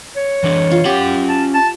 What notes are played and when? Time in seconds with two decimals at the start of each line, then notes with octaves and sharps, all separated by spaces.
0.16 C#5
0.44 E3 D4
0.71 F4
0.85 C#4 G4 F#5
1.29 A5
1.54 A5